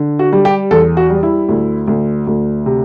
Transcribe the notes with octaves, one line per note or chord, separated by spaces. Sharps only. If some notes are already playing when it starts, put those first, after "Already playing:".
Already playing: D3
F#4
G3
G4
E2 A4
F#4
G3
E4
D2
D2
D2
C3